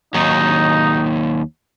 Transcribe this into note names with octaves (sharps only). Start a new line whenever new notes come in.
D#2 F#3 D#4